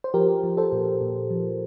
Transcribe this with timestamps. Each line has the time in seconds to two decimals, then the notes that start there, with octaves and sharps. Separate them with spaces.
0.04 C5
0.14 F3 G4 A#4
0.44 F3
0.57 A4 C5
0.72 A#2
1.01 A#2
1.30 F3